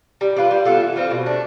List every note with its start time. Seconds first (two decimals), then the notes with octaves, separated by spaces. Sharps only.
0.21 G3
0.37 D4 F4 B4
0.51 G3
0.65 B3 F4 A4
0.81 E3
0.96 G3 C4 F4
1.11 B2
1.26 A3 D4